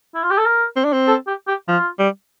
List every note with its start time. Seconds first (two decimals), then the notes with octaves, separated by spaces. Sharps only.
0.15 E4
0.23 F4
0.31 G4
0.38 A4
0.46 A#4
0.76 C4
0.85 D4
0.93 C4
1.08 A4
1.27 G4
1.48 G4
1.68 F3 F4
1.99 G3